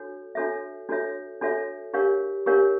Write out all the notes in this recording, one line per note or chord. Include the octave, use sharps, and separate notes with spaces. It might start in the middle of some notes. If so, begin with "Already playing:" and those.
Already playing: D4 F#4 A4 C#5
D4 F#4 A4 C#5 E5
D4 F#4 A4 C#5 E5
D4 F#4 A4 C#5 E5
D4 G4 A#4 C#5 F5
D4 G4 A#4 C#5 F5